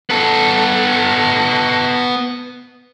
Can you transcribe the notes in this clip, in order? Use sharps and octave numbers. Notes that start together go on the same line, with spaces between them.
B3 A4